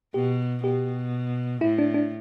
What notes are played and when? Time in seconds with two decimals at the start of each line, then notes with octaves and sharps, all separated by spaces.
0.14 B2 G4
0.63 B2 G4
1.61 A2 E4
1.78 D4
1.94 D4